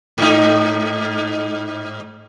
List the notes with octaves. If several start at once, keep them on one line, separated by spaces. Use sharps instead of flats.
G#2 D#4